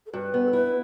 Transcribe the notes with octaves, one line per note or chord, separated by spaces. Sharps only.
A4
G2 B4
B3
A4
E4 B4